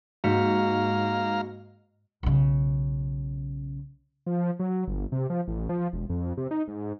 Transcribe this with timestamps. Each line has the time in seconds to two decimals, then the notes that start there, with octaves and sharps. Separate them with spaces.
0.24 G#2 A#3 F#4 F5 A#5 C#7
2.23 B1 C#3
4.26 F3
4.59 F#3
4.88 G1
5.12 C3
5.30 F3
5.48 A1
5.69 F3
5.93 E1
6.09 F2
6.37 C3
6.51 D#4
6.68 G#2